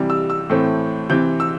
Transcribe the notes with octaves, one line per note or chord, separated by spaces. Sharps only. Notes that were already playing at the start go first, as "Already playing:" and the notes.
Already playing: C3 E3 G3
E6
E6
A2 E3 A3 C4
C3 E3 C4 G6
E6